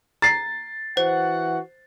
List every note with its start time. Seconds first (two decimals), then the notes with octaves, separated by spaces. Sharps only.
0.22 A#5 A6 C7
0.97 E3 F#4 C5 F#5